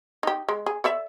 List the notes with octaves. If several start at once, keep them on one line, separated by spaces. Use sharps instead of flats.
D#4 G4
G#3
G#4
A4 D5 E5